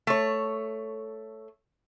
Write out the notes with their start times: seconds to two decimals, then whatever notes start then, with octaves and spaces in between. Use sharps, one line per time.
0.07 A3 C#5